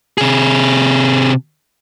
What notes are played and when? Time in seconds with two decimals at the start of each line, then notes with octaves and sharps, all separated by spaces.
0.18 C3 G#4